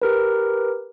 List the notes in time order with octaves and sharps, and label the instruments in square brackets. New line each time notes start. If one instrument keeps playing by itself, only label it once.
[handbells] G4 A#4 B4